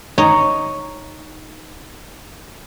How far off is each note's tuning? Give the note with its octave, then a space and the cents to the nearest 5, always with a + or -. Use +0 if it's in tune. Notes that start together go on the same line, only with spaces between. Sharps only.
D#4 +0 C#5 +0 A#5 +0